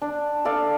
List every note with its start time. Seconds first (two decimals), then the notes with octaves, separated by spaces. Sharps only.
0.02 D4
0.45 A4 D5 F5